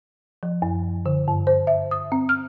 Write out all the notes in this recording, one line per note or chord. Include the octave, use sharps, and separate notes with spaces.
F3
F#2
D3
G2
C5
E5
D#6
C4
F6